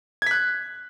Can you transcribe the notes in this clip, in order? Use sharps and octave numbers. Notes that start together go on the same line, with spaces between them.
F#6 G#6 B6